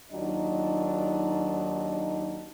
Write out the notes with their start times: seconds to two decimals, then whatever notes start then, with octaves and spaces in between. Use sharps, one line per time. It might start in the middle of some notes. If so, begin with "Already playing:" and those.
0.11 D#2 F#3 D4 D#4 F4 D#5